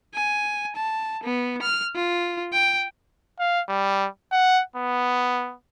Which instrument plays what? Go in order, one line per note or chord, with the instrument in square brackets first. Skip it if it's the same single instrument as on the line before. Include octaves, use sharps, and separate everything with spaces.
[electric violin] G#5
A5
B3
F6
F4
G5
[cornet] F5
G3
F#5
B3